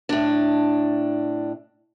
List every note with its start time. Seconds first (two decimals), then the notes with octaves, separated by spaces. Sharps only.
0.09 A2 D4